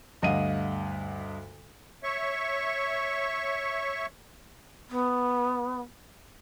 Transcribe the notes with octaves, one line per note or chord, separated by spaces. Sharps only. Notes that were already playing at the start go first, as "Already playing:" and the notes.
D2 G2 D#5 F5 F#5 D#7
C#5 E5 C#6
B3